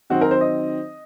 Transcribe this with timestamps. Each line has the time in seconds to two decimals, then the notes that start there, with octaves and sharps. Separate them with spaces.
0.10 D#3 F#3 C4 D#4 F#4
0.21 A#4
0.31 C5
0.41 D#5